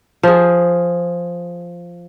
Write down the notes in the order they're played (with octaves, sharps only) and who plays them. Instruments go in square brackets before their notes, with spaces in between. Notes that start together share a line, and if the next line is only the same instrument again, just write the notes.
[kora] F3 G#4